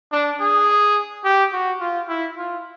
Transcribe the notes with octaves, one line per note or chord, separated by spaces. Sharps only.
D4
G#4
G4
F#4
F4
E4
F4